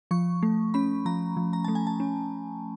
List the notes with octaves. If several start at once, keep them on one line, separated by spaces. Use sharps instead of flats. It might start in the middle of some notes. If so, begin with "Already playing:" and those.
F3 C#6
A3
C#4 B5
F3 A#5
F3
A#5
A3 A5
G#5
A5
C#4